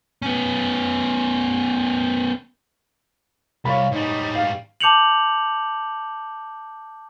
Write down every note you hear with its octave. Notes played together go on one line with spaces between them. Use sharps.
B3 C#4
C2 C#5 F5 B5
G#2 G3 D#4
F5
A5 D6 G6 C#7 F7 F#7